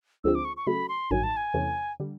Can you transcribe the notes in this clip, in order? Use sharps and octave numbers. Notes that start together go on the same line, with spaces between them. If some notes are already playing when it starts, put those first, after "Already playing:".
D2 D3 F3 G#3 C4 E6
D6
C#6
C#6
C#3 F#3 A3 B5
C6
A1 G2 D#3 F#3 G#5
A5
G#5
E2 C3 E3 A3 C#4
D3 G3